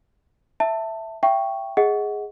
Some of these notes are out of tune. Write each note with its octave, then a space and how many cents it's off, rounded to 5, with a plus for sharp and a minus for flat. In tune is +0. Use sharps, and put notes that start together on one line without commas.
E5 +0 A5 +15
E5 +25 G5 +0 C#6 +0
G#4 +0 D#5 +30 F#5 +0